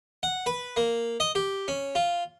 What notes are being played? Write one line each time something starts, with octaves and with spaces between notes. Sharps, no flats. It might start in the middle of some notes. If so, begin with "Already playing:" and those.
F#5
B4
A#3
D#5
G4
C#4
F4